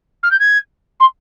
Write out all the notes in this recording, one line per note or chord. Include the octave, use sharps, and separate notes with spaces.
F6
G6
G#6
C6